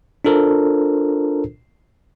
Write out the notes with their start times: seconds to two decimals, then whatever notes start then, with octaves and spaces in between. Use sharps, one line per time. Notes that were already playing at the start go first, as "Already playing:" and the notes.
0.25 D4 F4 A4 A#4 C5